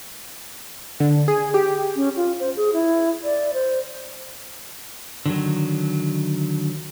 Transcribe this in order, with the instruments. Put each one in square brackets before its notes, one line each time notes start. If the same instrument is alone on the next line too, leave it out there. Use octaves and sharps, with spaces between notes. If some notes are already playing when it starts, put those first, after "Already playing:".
[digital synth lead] D3
G#4
G4
[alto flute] C#4
F4
C5
G#4
E4
D5
C5
[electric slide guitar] D3 D#3 F#3